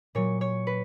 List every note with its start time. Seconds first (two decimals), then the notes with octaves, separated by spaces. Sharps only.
0.15 A#2 F#3 C#5
0.41 C#5
0.67 B4